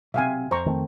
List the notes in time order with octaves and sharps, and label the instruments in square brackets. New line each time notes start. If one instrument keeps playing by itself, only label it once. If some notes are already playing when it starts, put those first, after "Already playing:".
[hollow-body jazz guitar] B1 C3 [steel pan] E5 F5 G#5
[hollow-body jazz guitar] F2 [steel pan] C5 A#5 C#6
[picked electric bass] D#3 A3 C4